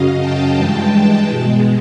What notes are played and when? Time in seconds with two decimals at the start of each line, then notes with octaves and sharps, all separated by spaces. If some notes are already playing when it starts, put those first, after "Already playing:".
Already playing: F#2 C#3 F#3 D#5 F5
0.21 G5 A5
0.56 G2 E3 G#3
1.27 B2 G#3